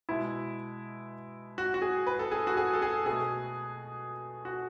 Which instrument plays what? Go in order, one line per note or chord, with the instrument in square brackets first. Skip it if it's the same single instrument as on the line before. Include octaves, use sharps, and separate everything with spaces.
[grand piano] B2 G#3 E4
F#4
F#4
G#4
B4
A4
G#4
F#4
G#4
A4
G#4
B2 A3 G#4
F#4